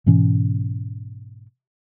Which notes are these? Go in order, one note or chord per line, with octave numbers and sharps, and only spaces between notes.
G#2 B2 E3 C#4